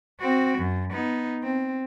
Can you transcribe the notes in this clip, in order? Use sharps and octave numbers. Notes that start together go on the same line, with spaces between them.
C4 F#4
F#2
B3 D#4
C4